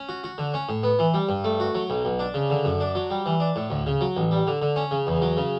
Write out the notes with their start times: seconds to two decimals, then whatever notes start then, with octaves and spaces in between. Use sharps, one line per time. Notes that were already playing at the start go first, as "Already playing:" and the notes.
Already playing: C#4
0.09 F#4
0.24 F#4
0.38 D3
0.54 C#4
0.69 A2
0.83 B3
0.99 E3
1.14 G3
1.29 G2
1.44 A3
1.60 F#4
1.75 F#3
1.90 B1
2.05 B1
2.19 D4
2.34 C#3
2.50 D3
2.65 F#2
2.81 D4
2.95 F#3
3.10 G3
3.26 E3
3.40 D4
3.56 A2
3.70 D2
3.87 C#3
4.01 F#3
4.17 A1
4.31 G3
4.47 D3
4.62 D3
4.76 C#4
4.91 C#3
5.07 E2
5.22 F#3
5.37 C#3